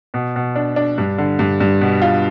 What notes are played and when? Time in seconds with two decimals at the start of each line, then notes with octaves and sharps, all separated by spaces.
0.14 B2
0.36 B2
0.56 D4
0.76 D4
0.98 G2
1.18 D3
1.39 G2
1.60 G2
1.81 B2
2.02 F4